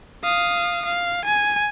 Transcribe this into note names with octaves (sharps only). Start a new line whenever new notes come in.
F5 D#6
F5
G#5